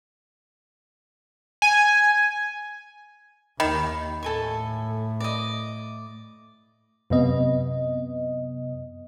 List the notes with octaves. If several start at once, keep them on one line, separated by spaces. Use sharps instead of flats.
G#5
D#2 D#3 B5
A2 A4 G#5 C#6
D5 D#5
F#2 C3 B3 D#5